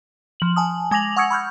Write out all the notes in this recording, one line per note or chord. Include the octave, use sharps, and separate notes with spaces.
F3 F#7
G#5 A5 D#6
G#3 G#5 D6 A#6 F7 F#7
F#5 C#6 D#6 E6 G#6 C#7
B5 C#6 F6 G6